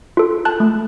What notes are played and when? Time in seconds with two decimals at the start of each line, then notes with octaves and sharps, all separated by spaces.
0.17 F4 A4
0.45 A5 F#6
0.60 A3